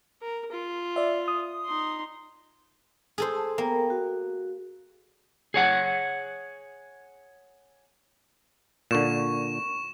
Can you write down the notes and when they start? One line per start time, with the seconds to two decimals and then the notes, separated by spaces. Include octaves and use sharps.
0.22 A#4
0.52 F4
0.96 D5 E5
1.28 D#6
1.66 D#4 C6
3.18 G#4 A4 C5
3.35 A5
3.58 A#3 B3 G5
3.90 F#4
5.54 G#4 C#5 F#5
8.91 A#2 D3 C#6 E7